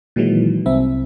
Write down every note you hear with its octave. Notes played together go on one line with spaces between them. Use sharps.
A#2 D#3 E3 F#3 G#3
C2 C4 E5